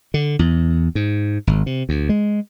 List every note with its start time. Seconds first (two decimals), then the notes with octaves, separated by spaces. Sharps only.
0.14 D3
0.39 E2
0.95 G#2
1.47 G#1
1.66 C3
1.89 D2
2.09 G#3